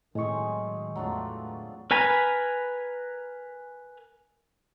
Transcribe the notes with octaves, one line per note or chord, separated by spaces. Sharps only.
A2 D#3 F#3 G#3 C4 G#4 C#6
E2 D3 F#3 A3 D4 F4
A#4 B4 G#5 A#5 B5